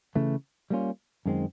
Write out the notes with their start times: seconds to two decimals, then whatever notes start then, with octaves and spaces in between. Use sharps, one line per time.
0.15 C#3 E3 A3
0.70 G3 A#3 C#4 F4
1.26 F#2 D#3 G#3 C4